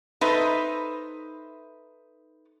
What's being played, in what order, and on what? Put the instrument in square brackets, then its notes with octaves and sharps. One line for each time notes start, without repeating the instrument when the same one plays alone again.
[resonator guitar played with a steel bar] D#4 A4 B4 C5 E5